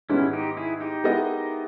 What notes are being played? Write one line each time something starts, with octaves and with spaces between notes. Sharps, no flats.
G#2 D#3 G3 B3 C#4 E4
D#4 G4
E4 G#4
D#4 G4
G#3 B3 E4 A#4 D#5